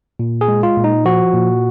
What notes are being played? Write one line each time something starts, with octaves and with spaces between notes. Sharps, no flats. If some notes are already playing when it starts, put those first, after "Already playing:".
A#2
G#4
G#3
F4
A#2
D#4
F3 F#4
A#2